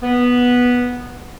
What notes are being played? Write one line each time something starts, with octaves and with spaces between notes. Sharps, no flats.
B3